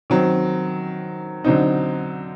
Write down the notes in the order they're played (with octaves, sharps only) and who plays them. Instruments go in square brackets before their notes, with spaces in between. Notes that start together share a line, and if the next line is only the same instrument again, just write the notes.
[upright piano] D#3 F#3 C4
D3 F#3 C4 D#4